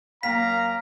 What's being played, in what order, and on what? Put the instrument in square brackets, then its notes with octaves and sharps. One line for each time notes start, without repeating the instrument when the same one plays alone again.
[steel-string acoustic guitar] F#2 A#3 G5 [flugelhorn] F5 [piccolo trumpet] A#5 [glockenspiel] B6